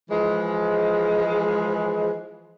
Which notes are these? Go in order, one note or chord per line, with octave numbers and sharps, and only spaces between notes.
E3 F3 G#3